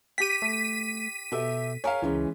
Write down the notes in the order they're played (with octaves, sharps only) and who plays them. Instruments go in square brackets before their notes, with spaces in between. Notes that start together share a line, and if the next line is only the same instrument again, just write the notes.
[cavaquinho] G4 G5 [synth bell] B6 D#7
[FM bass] A3
[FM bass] B2 [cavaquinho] G4 E5 [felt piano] A4
[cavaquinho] G#4 A#4 [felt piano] C#5 F5
[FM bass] C#2 [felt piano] E3 G#3 C#4